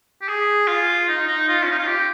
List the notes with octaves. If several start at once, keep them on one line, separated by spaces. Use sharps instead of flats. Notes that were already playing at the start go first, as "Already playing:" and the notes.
G4
G#4
F4
D#4
D#4
F4
C#4
D#4
F4
G4